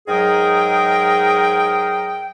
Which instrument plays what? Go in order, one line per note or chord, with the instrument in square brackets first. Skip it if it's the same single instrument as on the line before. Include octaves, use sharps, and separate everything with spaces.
[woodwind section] G#2 F#3 G#4 A#4 D#5 G5